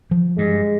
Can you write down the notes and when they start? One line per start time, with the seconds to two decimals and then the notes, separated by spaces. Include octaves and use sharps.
0.11 F3
0.37 G2 G#3